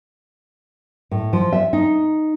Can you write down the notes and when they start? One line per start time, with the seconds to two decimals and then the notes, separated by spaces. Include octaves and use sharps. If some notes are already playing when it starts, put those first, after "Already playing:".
1.11 A2
1.33 F3
1.52 E5
1.73 D#4